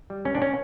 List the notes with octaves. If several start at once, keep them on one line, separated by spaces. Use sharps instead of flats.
G3
C#2 C#4
D4
C#4